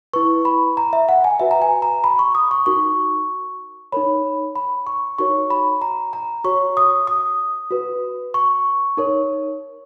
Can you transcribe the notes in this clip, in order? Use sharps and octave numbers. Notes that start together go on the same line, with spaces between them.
E4 B4 C#6
B5
A#5
E5
F#5
G#5
F#4 B4 E5
A#5
G#5
A#5
B5
C#6
D#6
C#6
D#4 F#4 A#4 C#6
D#4 A#4 C#5 B5
B5
C#6
D#4 F#4 A#4 C#5 C#6
B5
A#5
A#5
F#4 C#5 C#6
D#6
D#6
F#4 B4
C#6
D#4 A#4 C#5